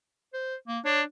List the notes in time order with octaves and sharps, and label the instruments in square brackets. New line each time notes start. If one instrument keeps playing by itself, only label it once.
[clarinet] C5
A#3
[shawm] D4 [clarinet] C#5